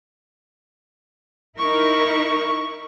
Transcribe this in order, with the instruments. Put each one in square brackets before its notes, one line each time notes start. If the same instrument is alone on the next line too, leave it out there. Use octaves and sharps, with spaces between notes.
[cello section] D#4 E4 A#4 [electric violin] C#6